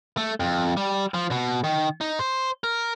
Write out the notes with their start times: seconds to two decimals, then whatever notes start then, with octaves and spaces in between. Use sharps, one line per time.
0.17 A3
0.40 F2
0.77 G3
1.14 F3
1.31 B2
1.64 D#3
2.01 D#4
2.19 C5
2.64 A#4